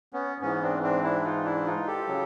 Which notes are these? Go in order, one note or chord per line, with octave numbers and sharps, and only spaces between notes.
B3 C#4
G#2 E3 B3 C#4
C4 D4
C4 D4
D4 E4
D#4 F4
D4 E4
D#4 F4
G4 A4
C#3 F#3